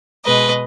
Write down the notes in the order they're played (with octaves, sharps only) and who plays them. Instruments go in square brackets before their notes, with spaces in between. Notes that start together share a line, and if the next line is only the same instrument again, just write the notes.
[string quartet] B2 G#3 B4 D#5